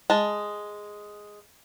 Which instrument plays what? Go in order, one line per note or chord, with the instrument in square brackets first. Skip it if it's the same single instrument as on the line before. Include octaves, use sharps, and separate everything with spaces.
[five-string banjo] G#3 A5